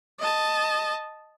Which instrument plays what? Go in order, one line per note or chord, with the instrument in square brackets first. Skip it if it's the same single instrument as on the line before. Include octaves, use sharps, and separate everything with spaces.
[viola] D#5 A5